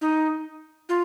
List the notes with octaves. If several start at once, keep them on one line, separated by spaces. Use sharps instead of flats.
D#4
F4